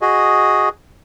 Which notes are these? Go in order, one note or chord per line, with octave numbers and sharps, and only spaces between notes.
F#4 G#4 D#5